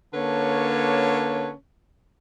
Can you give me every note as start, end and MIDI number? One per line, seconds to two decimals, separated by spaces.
0.14 1.51 50
0.14 1.51 58
0.14 1.51 61
0.14 1.51 71
0.14 1.51 73
0.14 1.51 81